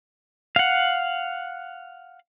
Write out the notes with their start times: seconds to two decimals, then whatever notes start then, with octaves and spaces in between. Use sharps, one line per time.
0.56 F5 F#5